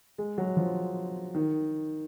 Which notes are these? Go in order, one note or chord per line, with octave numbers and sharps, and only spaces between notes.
G#3
F#3
F3
D#3